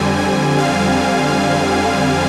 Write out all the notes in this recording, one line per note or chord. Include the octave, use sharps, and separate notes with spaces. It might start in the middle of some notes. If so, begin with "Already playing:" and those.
Already playing: F2 D3 G3 C4 G#5
G#5
F5